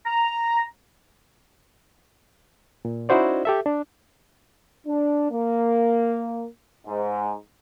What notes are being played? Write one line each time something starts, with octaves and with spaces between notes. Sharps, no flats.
A#5
A#2
C#4 D#4 E4 F#4 C5 D5
G4 A4 E5
D4
D4
A#3
G#2